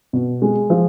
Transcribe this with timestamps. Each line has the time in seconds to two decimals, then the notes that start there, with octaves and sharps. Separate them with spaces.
0.13 B2
0.42 G#3
0.70 F3